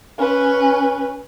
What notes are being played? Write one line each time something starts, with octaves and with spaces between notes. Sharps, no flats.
C#4 B4